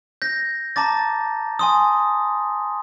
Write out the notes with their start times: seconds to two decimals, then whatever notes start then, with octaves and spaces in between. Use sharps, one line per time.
0.22 G6 A#6
0.76 A5 A#5 D6 A6
1.59 G#5 C6 D#6